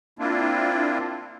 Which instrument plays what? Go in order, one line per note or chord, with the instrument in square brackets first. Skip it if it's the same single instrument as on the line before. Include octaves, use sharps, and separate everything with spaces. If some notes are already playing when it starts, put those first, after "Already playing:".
[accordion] A#3 C4 D4 E4 F4